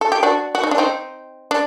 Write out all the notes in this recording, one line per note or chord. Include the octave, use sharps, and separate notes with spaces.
A4
G4
D4 F#4
F#4
D#4
D4
C4 D#4
D4